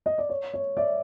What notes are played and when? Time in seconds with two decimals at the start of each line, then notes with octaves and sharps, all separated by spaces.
0.06 D#5
0.18 D5
0.29 C#5
0.54 C#5
0.77 D5 E5